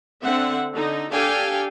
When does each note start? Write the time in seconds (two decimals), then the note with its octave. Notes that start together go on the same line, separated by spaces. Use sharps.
0.23 D3 C4 E5 F#5
0.73 D3 D#4
1.11 D4 G4 A4 F5 G5 G#5